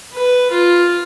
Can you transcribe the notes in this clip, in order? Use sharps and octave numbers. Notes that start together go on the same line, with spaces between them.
B4
F4